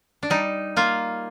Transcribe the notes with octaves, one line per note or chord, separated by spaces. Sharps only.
D4
G3 D#4
A#3 F4